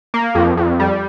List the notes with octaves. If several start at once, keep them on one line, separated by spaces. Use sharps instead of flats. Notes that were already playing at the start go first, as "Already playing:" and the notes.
A#3
F2
F2
G3